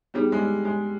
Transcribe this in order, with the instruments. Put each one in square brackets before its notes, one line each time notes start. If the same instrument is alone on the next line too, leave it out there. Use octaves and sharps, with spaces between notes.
[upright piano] G3 [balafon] B3 D#4 G#4
[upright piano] G#3
G3
G#3